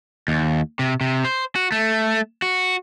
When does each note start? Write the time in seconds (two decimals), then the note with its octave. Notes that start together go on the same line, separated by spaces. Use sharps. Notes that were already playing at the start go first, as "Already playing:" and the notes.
0.28 D#2
0.79 C3
1.01 C3
1.25 C5
1.56 F#4
1.72 A3
2.42 F#4